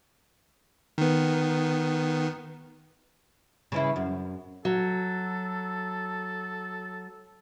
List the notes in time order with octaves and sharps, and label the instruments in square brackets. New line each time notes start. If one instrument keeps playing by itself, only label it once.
[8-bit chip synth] D#3 B3
[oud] C#3 E3 E4
F#2
[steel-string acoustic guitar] F#3 [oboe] A4